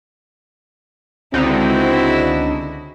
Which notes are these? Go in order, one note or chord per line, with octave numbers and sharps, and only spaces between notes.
C#2 D3 C4 D#4 E4 F#4